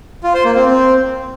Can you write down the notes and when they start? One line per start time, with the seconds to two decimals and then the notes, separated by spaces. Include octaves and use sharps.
0.24 F4
0.34 C5
0.45 A#3
0.55 C4
0.66 C4